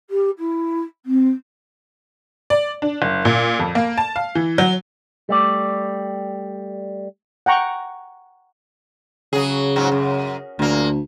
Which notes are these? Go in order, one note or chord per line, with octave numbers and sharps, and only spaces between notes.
G4
E4
C4
D5
D4
F#1
A#2
F2
A#3
A5
F5
E3
F#3
G3 A3 D5
F#5 G5 A#5 C#6
C#3 F#3 G#4
G#2 F#3
F#2
D2 A#2 A#3